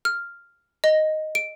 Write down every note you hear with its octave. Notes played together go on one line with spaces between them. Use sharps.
F6
D#5
D7